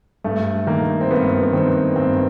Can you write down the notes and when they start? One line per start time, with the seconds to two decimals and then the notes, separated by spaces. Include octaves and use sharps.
0.24 G2 A3
0.67 D#3 A#3
1.01 C4
1.11 G2 B3
1.43 B3
1.53 D#3 C4
1.96 G2 C4